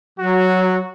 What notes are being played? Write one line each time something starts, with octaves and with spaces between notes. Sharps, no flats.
F#3 F#4